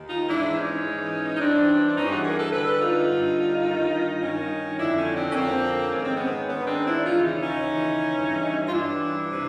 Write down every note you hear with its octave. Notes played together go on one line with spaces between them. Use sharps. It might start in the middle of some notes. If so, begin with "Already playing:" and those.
Already playing: D#2 D#3
D#4 F4
G#2 E3 D4 E4
C#4 D#4
G#2 E3
D#4
G2 E3 C4 D4
D4
G2 E3 C#4 D#4
G4
F#4 G#4
G#4 A#4
A4 B4
G2 D3 A4 B4
D#4 F4
G2 D3
G2 D#3
G2 D#3 C#4 D#4
F2 D3 D4 E4
C#4 D#4
C4 D4
C#4
F2 D3 A#3 C4
G#2 D#3 C#4
C4
B3 C#4
G#2 D#3 B3 C#4
C4 D4
D4 E4
D#2 C#3 E3 D#4 F4
C#4 D#4
C#4 D#4
D#2 C#3 E3
G2 E3
F4
G2 E3 D4 E4
C3 E3